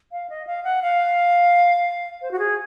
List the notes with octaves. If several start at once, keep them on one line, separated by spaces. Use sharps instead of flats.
F5
D#5
F5
F#5
F5
C5
F#4
G#4